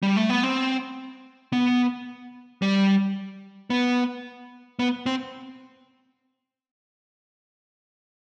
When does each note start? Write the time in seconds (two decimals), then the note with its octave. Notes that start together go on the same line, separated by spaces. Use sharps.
0.03 G3
0.16 A3
0.30 B3
0.43 C4
1.53 B3
2.62 G3
3.70 B3
4.79 B3
5.06 C4